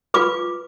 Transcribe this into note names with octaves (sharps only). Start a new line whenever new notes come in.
F4 B4 D6